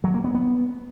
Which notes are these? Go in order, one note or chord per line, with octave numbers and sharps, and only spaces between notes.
F#3
A#3
B3
B3